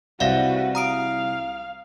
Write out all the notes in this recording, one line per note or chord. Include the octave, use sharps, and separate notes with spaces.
C2 C4 F#4 B4 D5 E5 F5 A#6
F5 A#5 D#6 D7